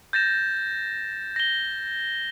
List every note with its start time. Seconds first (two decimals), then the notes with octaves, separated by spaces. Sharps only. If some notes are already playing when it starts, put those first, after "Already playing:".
0.13 G6 A6 A#6 E7
1.36 A#6 G7